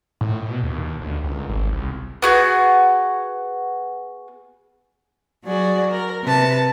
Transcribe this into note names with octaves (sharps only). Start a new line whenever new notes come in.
A2
B2
D#2
D2
C#2
G#1
C2
B3 F#4 G#4
F#3 F#4 G#4 D5
A#4
C3 B4 A5